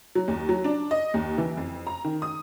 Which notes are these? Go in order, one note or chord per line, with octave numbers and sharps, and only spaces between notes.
F#3
D#2
F#3
D4
D#5
D#2
E3
F2
A#5
D#3
D#6